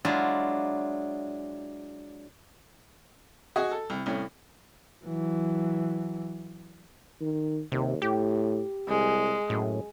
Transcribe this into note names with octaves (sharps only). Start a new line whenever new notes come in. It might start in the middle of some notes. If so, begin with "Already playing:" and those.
F#3 G#3 D4 E4 F4
F#4 G#4 D#5
A4
C2
C2 A2 C#4
E3 F#3
D#3
D#2 C3
A2 G4
C2 G#3
F#2 A2